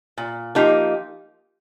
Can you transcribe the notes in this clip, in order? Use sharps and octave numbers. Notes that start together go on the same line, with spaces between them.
A#2
F3 A#3 D#4 G4